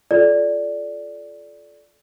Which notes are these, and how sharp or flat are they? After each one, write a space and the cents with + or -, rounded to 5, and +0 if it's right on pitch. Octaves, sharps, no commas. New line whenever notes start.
F4 +0 A4 -25 D5 -5